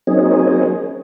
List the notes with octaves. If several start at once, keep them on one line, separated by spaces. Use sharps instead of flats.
F#3 A#3 C4 C#4 D#4 G#4